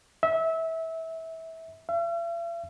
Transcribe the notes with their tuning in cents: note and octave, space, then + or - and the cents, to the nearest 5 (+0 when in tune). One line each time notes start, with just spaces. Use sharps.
E5 -25
E5 +45